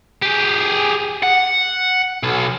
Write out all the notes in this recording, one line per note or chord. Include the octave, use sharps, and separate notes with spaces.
G4 G#4
F#5
B1